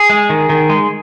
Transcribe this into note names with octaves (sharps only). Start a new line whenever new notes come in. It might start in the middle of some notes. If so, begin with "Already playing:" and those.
Already playing: G#4
G#3
D#3
D#3
G#3